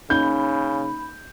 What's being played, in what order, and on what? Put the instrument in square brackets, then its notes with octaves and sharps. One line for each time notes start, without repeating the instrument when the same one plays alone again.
[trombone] C#3 [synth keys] A#3 C#4 D#4 [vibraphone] B5 [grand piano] G6